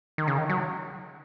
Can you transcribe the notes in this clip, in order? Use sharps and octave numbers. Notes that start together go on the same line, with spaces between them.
D#3
C#3
D#3
F#3